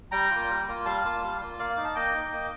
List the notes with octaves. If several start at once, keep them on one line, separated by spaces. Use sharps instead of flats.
G3 G5 A#5
A#3 F4
G3
A#3 F4
G3 F5 A5
A#3 F4
G3
A#3 F4
A#3 D5 F5
D#4
A5
A#3 D#5 G5
D#4
A#3